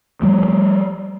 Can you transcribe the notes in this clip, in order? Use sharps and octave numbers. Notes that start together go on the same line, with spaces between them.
F3 G3 A3